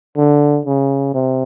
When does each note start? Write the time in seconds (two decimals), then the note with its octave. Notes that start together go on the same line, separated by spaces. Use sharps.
0.17 D3
0.66 C#3
1.14 C3